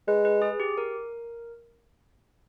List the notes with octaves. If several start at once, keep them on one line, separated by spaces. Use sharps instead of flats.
G#3 B4
B4
G#4
G4
A#4